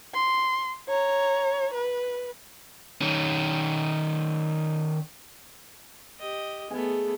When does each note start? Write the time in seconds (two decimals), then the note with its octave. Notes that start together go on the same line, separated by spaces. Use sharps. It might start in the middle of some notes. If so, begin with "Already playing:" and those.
0.14 C6
0.89 C#5 A#5
1.74 B4
3.01 D#3 C#4
6.19 G4 D#5
6.71 A3 B3 G#4 G#5